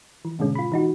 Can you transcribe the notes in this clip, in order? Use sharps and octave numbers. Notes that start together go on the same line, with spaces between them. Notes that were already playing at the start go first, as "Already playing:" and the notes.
E3
G#2 B2 D3 G#3 C#4
F4 B5
E3 D#4 F#4